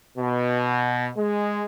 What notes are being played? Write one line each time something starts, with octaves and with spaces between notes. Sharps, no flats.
B2
G#3